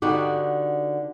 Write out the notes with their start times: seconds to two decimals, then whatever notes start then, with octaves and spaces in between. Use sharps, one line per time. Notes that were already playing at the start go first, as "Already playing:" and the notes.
0.02 D3 B3 D#4 F#4 G4